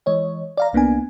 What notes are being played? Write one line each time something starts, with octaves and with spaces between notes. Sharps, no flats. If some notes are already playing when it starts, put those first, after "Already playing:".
E3 G#3 C#5 D#5
D5 F5 A#5
C2 A#3 B3 D4 G#5